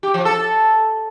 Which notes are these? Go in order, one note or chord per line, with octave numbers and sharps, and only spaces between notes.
G4
F3
A4